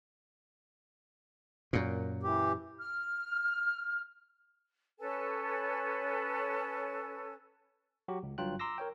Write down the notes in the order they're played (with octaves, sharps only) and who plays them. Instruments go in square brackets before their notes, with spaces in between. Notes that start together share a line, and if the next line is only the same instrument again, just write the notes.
[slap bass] F#2 A#2
[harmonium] E3 G4
[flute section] F6
C#4 A4 B4 G#5
[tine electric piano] F#3 F#4 G4
C#2
G1 G2 F#3 F4 G5 F#6
A#5 C6 D6 E6 A#6
A#4 C#5 G5